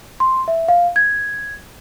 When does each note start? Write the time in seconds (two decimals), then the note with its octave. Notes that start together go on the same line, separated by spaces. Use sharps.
0.20 C6
0.48 E5
0.68 F5
0.96 G#6